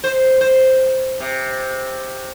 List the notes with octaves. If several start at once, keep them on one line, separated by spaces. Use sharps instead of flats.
C5
C5
C3